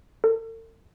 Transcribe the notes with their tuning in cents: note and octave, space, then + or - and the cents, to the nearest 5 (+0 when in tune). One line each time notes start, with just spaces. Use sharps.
A4 +45